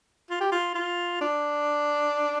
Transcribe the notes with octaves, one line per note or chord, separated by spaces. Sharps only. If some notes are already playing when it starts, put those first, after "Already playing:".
F4
G4
F4
F4
D4